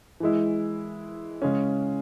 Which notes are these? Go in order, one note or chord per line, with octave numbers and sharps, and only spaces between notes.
E3 G#3 E4
C#3 G#3 C#4